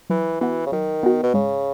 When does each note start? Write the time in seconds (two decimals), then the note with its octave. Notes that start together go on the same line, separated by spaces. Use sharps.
0.10 E3 F#3
0.40 E3 B3 F#4
0.66 C#3
0.72 D#3 F#3
1.03 B3 F#4
1.23 B2
1.34 G#2 C#3